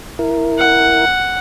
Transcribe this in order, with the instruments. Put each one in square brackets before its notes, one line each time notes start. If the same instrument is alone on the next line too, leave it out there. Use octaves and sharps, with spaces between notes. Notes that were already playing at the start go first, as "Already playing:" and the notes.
[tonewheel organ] E4 A#4
[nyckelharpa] F#5